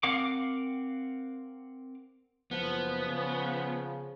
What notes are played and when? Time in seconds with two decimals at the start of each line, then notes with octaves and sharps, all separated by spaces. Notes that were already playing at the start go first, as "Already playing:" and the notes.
0.03 C4 A#4 F5 F#5 D6
2.51 F#1 F3 B3
3.08 C#3